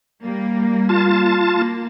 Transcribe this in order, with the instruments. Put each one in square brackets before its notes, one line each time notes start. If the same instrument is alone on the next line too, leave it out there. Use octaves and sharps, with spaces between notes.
[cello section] G3 A#3
[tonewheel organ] F4 A5
[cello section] A#3